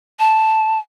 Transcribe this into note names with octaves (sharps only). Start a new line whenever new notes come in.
A5